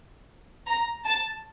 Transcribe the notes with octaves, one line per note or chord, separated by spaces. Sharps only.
A#5
A5